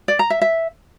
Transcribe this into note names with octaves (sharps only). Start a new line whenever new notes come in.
D5
A#5
E5
E5